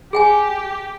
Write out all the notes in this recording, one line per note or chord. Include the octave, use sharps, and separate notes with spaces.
G4 G#4 G5 G#5